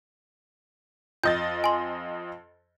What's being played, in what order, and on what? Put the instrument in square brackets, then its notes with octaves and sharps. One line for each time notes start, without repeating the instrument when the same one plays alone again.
[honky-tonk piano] F2 D#5 A6 [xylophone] G6
[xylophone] G#5 C6